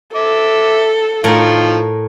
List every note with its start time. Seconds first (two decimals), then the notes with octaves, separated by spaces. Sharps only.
0.15 A4 E5 D6
1.24 A2 D#3 F3 F4 A#4